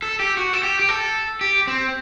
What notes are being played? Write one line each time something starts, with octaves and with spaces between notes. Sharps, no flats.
A4
G4
F#4
A4
G4
G4
A4
G4
C4